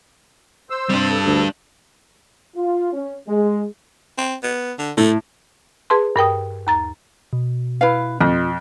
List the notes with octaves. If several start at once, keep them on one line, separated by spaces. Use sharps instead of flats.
C5 E6
C3 G3 D4
A4
D2
F4
C#4
G#3
C4
B3
D3
A2 A3
G#4 B4 A5 C6
G2 A#4 G5 D#6
D#2 A#5 A6
B2
E4 B4 F5
F2 F4